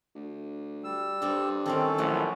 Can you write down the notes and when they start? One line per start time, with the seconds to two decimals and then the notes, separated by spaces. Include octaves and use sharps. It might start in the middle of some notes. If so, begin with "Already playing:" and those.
0.15 D2
0.84 G3 E6
1.22 G2 C4 A4
1.66 D#3 E3 A3 C4 C#4 A4
1.98 A#1 A2 E3 F#3 C#4